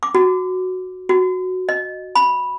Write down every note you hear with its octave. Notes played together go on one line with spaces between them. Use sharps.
D6
F#4
F#4
D#5
B5